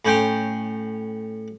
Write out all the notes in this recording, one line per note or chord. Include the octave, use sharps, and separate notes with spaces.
A2 C#4 G5 C6